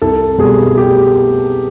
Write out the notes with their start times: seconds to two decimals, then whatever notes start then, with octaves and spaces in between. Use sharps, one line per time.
0.02 C2 A4
0.38 B2 G3 G#4
0.77 G4